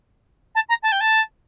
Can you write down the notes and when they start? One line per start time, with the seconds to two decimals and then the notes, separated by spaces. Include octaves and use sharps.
0.55 A5
0.69 A#5
0.83 A5
0.92 G5
1.01 A5